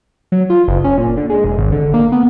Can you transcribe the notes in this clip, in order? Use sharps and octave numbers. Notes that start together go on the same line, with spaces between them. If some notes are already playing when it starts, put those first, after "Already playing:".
F#3
F4
F#1
C#4
A#2
D3
G#3
E1
G#1
D3
A#3
B3